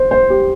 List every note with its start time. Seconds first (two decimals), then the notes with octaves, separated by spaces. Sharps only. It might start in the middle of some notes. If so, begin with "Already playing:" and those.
Already playing: C5
0.11 C5
0.30 G4